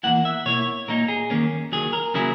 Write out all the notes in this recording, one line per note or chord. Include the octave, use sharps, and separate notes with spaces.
E2 B2 A#3 E4 F#5
E5
B2 A#3 E4 C#5
A#2 A#3 D#4 A#4
G#4
F#2 D#3 A#3 C#4
D#2 D#3 F#3 G#4
A#4
C#3 F#3 A#3 E4 G#4